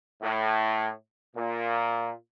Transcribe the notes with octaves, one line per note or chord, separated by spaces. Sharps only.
A2
A#2